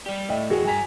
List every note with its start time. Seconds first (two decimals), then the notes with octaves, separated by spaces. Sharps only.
0.06 G3 G4 D5
0.29 A2 A3 D#5 E5 G5
0.50 E2 E3 F#4 G#4
0.65 G2 G5 G#5 A#5 B6